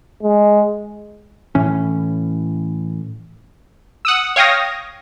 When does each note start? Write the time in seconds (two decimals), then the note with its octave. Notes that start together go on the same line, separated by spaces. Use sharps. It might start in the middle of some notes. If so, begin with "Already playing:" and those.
0.23 G#3
1.55 A2 E3 C#4
4.05 F#5 D#6 E6
4.36 C#5 F5 G5 D#6 A#6